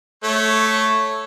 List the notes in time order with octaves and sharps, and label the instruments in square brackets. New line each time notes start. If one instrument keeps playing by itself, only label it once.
[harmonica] A3 C#5